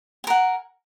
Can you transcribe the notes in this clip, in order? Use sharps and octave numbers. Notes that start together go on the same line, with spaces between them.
A#4 F#5 G#5